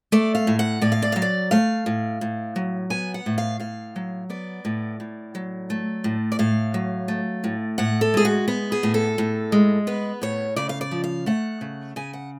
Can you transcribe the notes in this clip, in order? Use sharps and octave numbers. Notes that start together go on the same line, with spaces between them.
A3 D5
F5
A2
F#5
A2 D5
F5
D5
F#3 F5
D5
A3 F5
A2
A2
F#3
B3 G#5
F#5
A2
F5
A2 F5
F#3
B3 D5
A2
A2
F#3
A3
A2
D5
A2 F5
F#3
A3
A2
A2 F#5
A4
G#3 G#4
F#4
B3
G#4
A2
A4
A2
G#3
B3 B4
A2 C#5
C#3 D5
F5
D5
F3
F5
A3 F#5
C#3
C#3 G#5
F#5